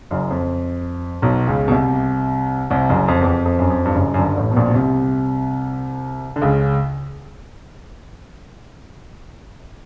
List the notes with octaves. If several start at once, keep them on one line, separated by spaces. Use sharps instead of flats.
F#1 F#2
F2
B1 B2
C#2 C#3
B2
C2 C3
C2 C3
F#1 F#2
F2
E2
F2
F2
F#2
F2
G2
F#1 F#2
F#2
G1 G2
A1 A2
B2
A#1 A#2
B2
C2 C3
D3
C#2 C#3